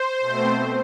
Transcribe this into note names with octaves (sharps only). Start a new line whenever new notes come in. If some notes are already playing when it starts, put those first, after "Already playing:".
Already playing: C5
B2 A3 C4